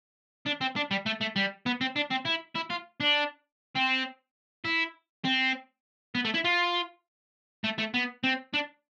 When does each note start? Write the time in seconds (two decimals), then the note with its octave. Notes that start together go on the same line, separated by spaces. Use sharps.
0.46 D4
0.61 C4
0.76 D4
0.91 G3
1.06 A3
1.21 A3
1.36 G3
1.66 B3
1.81 C4
1.96 D4
2.11 C4
2.26 E4
2.56 E4
2.70 F4
3.00 D4
3.75 C4
4.65 E4
5.25 C4
6.15 B3
6.25 A3
6.34 E4
6.44 F4
7.64 A3
7.79 A3
7.94 B3
8.24 C4
8.54 D4